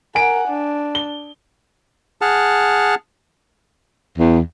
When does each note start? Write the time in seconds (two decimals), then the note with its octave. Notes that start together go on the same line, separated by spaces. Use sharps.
0.15 A#4 F#5 G#5 D7
0.48 D4
0.95 G7
2.21 G#4 F#5 A5 F6
4.18 E2